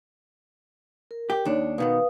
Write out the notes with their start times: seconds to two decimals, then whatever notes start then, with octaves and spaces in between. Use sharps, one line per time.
1.11 A#4
1.30 G4
1.45 D#2 D4 D#4 C#5
1.78 B2 D#3 B3 B4 F5 D#6